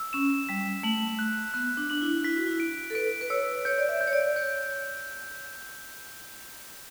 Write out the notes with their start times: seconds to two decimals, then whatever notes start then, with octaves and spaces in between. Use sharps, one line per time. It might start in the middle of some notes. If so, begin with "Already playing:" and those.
Already playing: E6
0.13 C#4 E7
0.49 G3 B6
0.83 A3 F#7
1.19 F#6
1.54 B3 F#6
1.77 D4
1.90 D4 F#7
2.02 E4
2.24 E4 B6
2.36 F#4
2.47 E4
2.60 D7
2.90 A4
2.95 B4 D7
3.21 B4
3.30 C#5 E6
3.65 C#5 G6
3.78 D5
3.89 E5
4.01 G6
4.07 C#5
4.13 D5
4.36 C#5 G6